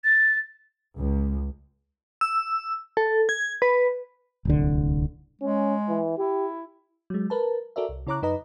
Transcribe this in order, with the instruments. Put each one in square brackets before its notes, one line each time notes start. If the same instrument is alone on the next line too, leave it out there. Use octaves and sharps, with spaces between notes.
[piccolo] A6
[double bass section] C#2
[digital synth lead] E6
A4
G#6
B4
[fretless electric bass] D1 C2 D3
[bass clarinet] G#3 [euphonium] C#4
[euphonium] E3
[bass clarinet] E4 [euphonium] G4
[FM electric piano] F#3 G#3
A#4 B4 A5
F#4 A4 A#4 D5 E5
C2
C#3 E4 C#5 A#5 D6 F#6
F#2 D#4 B4 D#5 A#5